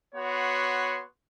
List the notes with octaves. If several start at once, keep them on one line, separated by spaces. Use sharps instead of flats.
B3 F#4 C#5 C6